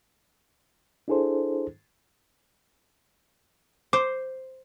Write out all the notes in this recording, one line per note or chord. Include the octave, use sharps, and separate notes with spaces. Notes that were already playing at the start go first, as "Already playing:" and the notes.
D4 E4 G#4 A4 C5
C5 D6